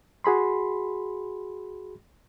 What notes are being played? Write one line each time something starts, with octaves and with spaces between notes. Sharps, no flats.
F#4 G#4 B5 C6